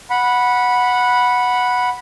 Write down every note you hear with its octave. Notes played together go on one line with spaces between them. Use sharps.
F#5 B5